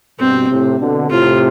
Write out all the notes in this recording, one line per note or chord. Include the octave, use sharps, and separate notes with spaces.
G2 B2 C4
A2 C3
B2 D3
A2 C3 F4